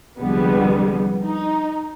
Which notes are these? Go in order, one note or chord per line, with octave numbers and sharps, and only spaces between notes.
C2 D3 F3 G3 G#3 B3
D#4